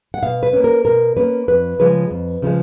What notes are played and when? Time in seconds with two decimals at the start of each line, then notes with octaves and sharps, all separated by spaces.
0.14 F#5
0.23 B2 F5
0.43 B4
0.53 A#3 C#4
0.64 A#4
0.85 B2 A#4
1.17 A#3 C#4 B4
1.48 F2 B4
1.79 C#3 F3 G#3 B4
2.11 F2
2.42 C#3 F3 G#3